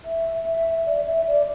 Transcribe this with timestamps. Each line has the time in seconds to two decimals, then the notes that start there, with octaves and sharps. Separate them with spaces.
0.05 E5
0.45 E5
0.87 D5
1.07 E5
1.27 D5